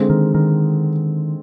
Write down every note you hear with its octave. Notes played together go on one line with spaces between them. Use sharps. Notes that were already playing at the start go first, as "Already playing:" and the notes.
Already playing: D3 G#3 C4
D#3
D#3